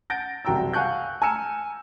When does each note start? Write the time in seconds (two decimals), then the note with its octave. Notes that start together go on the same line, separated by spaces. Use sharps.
0.10 F#5 G6 A6 A#6 D7
0.45 F#1 C2 F#4 G5 A#5 E6
0.73 F5 F#5 G#5 C#6 F#6 G6
1.22 G#5 A#5 E6 F6 C#7 E7